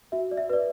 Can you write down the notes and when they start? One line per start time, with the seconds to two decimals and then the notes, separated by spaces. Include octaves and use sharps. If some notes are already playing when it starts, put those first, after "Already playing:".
0.12 F#4 E5
0.31 D5
0.37 E5
0.49 B4 D5